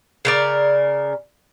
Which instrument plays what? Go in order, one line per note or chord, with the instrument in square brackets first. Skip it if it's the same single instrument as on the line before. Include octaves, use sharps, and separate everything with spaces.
[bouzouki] C#3 A#4 D5